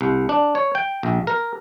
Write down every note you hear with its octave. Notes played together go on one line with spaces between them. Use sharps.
C2
D4
C#5
G5
A#1
A#4